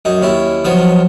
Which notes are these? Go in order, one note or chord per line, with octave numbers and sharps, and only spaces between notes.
F#2 D#4
D#2 C#4 E4
D#3 F3 F#3 B3